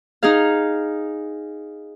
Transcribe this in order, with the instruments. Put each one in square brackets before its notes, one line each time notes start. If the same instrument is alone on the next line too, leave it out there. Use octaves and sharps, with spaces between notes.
[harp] D#4 G#4 F5